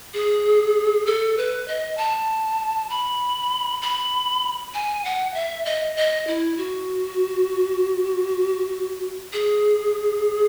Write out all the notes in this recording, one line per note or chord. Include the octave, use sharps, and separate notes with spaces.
G#4
A4
B4
D#5
A5
B5
B5
G#5
F#5
E5
D#5
D#5
E4
F#4
G#4